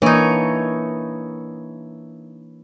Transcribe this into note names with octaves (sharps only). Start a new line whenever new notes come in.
E3 A#3 D4 D#4 C#5